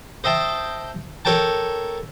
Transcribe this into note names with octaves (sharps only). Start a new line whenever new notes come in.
C5 D#5 E5 G5 A5
A4 A#4 C#5 G5 A5